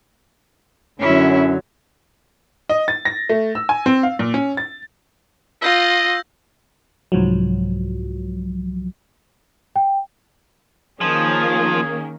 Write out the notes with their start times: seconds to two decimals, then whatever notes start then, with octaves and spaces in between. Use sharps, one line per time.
1.00 F#2 D3 F#3 C#4 E4
2.69 D#5
2.88 A6
3.05 A#6
3.29 A3
3.55 E6
3.69 G#5
3.86 C4
4.03 F5
4.19 A#2
4.34 C#4
4.57 A6
5.62 F4 D#5 E6 G6 A#6
7.12 C2 G#2 F3 F#3
9.76 G5
11.01 D#3 F3 A#3 C#4 G#4